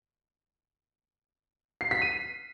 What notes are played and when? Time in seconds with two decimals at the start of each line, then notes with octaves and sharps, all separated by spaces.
1.81 C7
1.91 B6
2.02 D#7